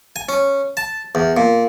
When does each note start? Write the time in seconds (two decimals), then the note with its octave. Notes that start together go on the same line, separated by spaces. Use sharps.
0.16 G#5
0.29 C#4
0.77 A5
1.15 E2
1.37 A#2